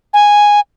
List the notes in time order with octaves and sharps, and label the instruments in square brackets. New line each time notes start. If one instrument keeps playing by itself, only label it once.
[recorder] G#5